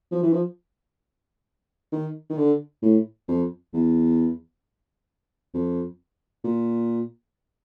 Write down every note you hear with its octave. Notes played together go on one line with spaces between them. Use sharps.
F3
E3
F3
D#3
D#3
D3
A2
F2
E2
F2
A#2